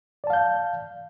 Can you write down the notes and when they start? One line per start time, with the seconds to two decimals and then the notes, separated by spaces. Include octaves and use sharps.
0.24 D5
0.27 A5
0.30 F5
0.33 G6